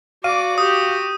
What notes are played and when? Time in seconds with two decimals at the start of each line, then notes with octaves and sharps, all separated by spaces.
0.24 F#4 D5 F5 D6 D#7
0.58 G4 D#6